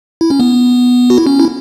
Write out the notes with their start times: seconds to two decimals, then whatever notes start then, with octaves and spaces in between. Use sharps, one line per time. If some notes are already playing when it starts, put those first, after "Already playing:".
0.21 E4
0.30 C#4
0.40 B3
1.10 F#4
1.18 E4
1.27 C#4
1.40 E4